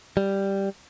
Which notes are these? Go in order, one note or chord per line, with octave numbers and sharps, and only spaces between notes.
G3